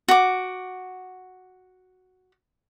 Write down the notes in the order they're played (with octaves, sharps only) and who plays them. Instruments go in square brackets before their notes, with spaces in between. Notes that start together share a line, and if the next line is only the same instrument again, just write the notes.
[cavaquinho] F#4 D6